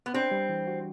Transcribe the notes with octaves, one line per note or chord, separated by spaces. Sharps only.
B3
C4 D4
G3
E3
F#4